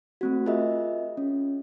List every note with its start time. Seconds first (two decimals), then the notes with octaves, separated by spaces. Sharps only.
0.21 A3 C4 F#4
0.46 F4 G#4 A#4 D#5 E5
1.17 C#4